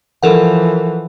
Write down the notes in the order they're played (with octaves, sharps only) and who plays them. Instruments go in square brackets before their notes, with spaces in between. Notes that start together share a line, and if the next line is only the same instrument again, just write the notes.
[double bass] E3 F3 [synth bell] A4 A#4 F#5